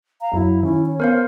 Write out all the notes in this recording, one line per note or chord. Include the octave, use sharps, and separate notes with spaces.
F5 A#5
F#2 F#3 E4
D#3 C#4 E4
C#5
B3 A#4 C5 F5